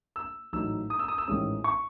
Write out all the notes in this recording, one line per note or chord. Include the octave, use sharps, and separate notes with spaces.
E6
A1 G#2 F#3 A3 D#4 E6
D#6
E6
D#6
E6
A1 G#2 D#3 G#3 C#4 D#6
C#6